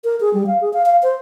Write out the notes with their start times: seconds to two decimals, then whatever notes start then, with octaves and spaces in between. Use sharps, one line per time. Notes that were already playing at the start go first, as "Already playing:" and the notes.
0.04 A#4
0.20 G#4
0.34 G3
0.47 F5
0.61 G#4
0.73 F5
0.86 F5
1.03 C5